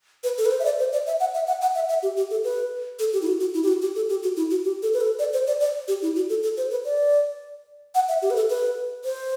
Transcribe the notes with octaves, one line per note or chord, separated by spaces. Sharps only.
B4
A4
B4
C5
E5
D5
C5
D5
E5
F#5
E5
F#5
F#5
E5
E5
G4
G4
A4
B4
A4
G4
E4
F#4
F#4
E4
G4
F#4
G4
A4
G4
F#4
E4
F#4
G4
A4
B4
A4
D5
C5
D5
D5
G4
E4
F#4
A4
A4
C5
B4
D5
F#5
E5
G4
B4
A4
B4
C5